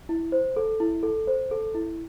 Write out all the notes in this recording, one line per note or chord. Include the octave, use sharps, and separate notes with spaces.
E4
C5
A4
E4
A4
C5
A4
E4